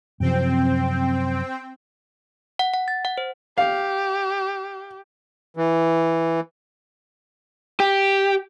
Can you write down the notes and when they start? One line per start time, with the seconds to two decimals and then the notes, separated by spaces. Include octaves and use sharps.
0.20 F#2 C3 F3 C4 G5
2.59 F#5
2.74 F#5
2.88 A6
3.05 F#5
3.18 C5
3.58 G4 F5
5.57 E3
7.80 G4